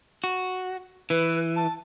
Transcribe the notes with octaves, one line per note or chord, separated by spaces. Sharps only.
F#4
E3 B4
A5